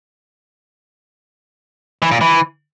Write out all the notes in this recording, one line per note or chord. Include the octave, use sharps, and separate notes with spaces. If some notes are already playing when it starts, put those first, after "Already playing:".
E3
A#2
E3